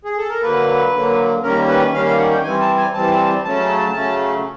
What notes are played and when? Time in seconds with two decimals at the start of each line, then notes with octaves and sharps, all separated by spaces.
0.05 G#4
0.18 A4
0.29 A#4
0.42 D3 F#3 A#3 B4
0.93 D3 F#3 A#3
1.43 D#3 G3 A#3 C#4 A#4
1.68 B4
1.93 D#3 G3 A#3 C#4 F5
2.06 F5
2.18 F#5
2.31 G5
2.44 E3 G3 C4 G#5
2.61 A5
2.77 G#5
2.94 E3 G3 C4 A5
3.44 C#3 F#3 A3 C#4 A5
3.95 C#3 F#3 A3 C#4